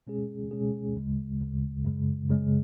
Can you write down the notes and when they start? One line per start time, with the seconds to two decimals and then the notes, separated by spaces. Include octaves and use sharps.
0.07 B2 G#3 C#4 G#4
0.51 B2 G#3 C#4 G#4
0.96 D2 C#3 G#3
1.40 D2 C#3 G#3
1.85 F#2 C#3 G#3
2.29 F#2 C#3 G#3